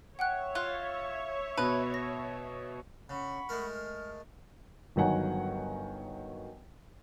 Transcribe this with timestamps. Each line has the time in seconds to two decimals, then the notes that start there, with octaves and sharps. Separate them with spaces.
0.19 C#5 E5 F#5 G5 F#6
0.55 F4 F#6
1.57 B2 B4
1.94 A#6
3.10 C#3 F#5 B5 C#6
3.49 G#3 A3 A#4
3.69 F6
4.96 G1 D#3 F#3 F#5 G#5